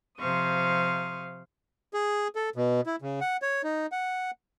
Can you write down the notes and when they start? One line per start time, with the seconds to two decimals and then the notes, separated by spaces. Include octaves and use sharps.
0.19 C3 F3 C5 F5 C#6 D#6
1.94 G#4
2.35 A4
2.56 B2
2.86 E4
3.02 C#3
3.21 F#5
3.42 C#5
3.64 D#4
3.92 F#5